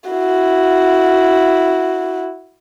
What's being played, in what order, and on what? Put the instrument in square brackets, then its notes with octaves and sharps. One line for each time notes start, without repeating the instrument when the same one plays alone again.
[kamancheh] E4 F#4